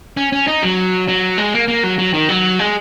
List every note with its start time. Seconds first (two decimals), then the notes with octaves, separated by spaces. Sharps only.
0.17 C#4
0.32 C#4
0.47 D#4
0.62 F#3
1.08 F#3
1.38 G#3
1.54 A#3
1.68 A#3
1.83 F#3
1.99 F#3
2.14 D#3
2.29 F#3
2.59 G#3